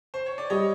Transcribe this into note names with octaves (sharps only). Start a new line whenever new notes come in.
C5
C#5
D5
G3 C#5 D#5